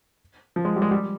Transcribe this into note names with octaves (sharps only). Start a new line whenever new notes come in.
F3
G#3
G3
G#3
G3